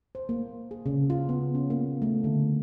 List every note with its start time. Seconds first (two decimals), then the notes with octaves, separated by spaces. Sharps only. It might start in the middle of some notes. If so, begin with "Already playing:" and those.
0.15 C5
0.29 A#3
0.71 G#4
0.86 C#3
1.10 F4
1.29 B3
1.55 C#4
1.70 A#3
2.02 A3
2.24 D3